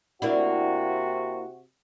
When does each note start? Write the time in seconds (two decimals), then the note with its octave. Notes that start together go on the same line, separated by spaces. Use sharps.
0.22 C3 A#3 D4 E4 F#4